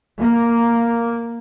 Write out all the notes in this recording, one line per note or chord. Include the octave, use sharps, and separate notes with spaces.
A#3